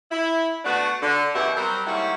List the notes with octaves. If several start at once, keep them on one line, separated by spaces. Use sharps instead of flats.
E4
A3 B3 D4 F#4
D3
F#2 B2 E3 G4 E5 F#5
F#3 G3 C4 A#4 C5
G#2 G3 A#3 E4 F#4 C#5